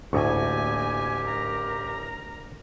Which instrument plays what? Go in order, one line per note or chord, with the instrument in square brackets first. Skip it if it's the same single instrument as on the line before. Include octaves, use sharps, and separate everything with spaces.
[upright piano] A1 E4 C#6 [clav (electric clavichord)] D2 [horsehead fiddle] A#3 G#5 [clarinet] G4
[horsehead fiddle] A#4 A#5